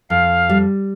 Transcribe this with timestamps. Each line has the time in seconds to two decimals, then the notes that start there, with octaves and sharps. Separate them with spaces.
0.10 F2 F5
0.49 G3